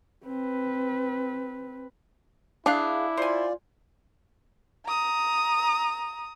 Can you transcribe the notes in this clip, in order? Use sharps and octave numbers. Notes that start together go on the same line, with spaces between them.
C4 B4
D4 E4 G#4 F5 F#6
F4 C5 D5 G#5
A#5 D#6